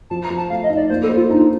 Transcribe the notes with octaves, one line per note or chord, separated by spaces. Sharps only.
F3 A5
A#5
F3
A5
A3 F5
D#5
D#4
D5
A#3 C5
A4
C5
F4
D4 D#4